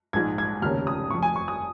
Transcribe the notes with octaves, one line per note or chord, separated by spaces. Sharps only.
A#1 G#2 G#3 D#4 G#6
G#6
F1 D#2 C#3 A#3 C#4 F6
D#6
F1 F2 F3 C#6
G#5
C#6
D#6